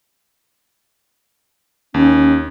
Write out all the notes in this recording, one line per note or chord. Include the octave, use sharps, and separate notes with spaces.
D#2 C#4